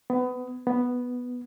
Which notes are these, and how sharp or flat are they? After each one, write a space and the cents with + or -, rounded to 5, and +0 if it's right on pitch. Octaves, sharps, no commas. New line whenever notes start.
B3 +25
B3 +0